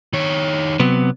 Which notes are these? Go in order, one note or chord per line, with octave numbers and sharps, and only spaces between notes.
D#3 C#5
C3 F#3 B3